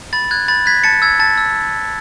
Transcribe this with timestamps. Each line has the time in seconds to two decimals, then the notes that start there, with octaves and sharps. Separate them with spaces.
0.13 B5 A6
0.31 F#6 G#6
0.48 B5 A6
0.66 F#6 G#6 B6
0.84 A5 A6 C#7
1.02 E6 G#6
1.20 A5 A6
1.38 E6